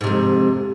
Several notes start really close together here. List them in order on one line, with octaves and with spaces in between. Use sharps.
G#2 C3 F2